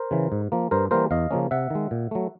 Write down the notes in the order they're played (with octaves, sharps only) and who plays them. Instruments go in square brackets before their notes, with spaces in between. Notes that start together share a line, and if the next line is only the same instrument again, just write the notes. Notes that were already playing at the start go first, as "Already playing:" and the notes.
Already playing: [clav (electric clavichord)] A#4 C5
C#3 E3
G#2
F3 A#3
G2 A#4 C5
E3 G3 A#3 A#4 C5
E2 D#5 F5
C#3 F3 A#3 C#4
C3 E5 F#5
D#3 G#3
A#2
F#3 A3